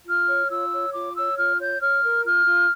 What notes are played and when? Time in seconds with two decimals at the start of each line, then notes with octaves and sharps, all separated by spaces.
0.07 F4 F6
0.28 C#5
0.49 F4 E6
0.72 C#5
0.93 F4 D6
1.15 C#5 E6
1.36 F4 F6
1.58 C#5 G6
1.80 C#5 F6
2.03 A#4
2.24 F4 F6
2.46 F4